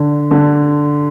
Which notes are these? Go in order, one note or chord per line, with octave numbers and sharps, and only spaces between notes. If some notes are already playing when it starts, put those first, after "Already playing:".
Already playing: D3
D3